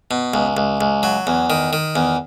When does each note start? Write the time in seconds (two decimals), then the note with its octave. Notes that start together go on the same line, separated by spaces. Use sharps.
0.11 B2
0.34 C#2
0.57 C#2
0.81 C#2
1.03 F#3
1.27 E2
1.50 D#3
1.73 D#3
1.96 E2